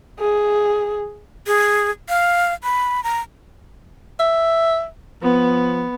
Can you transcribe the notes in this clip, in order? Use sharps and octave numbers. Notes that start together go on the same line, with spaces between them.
G#4
G#4
F5
B5
A#5
E5
F3 B3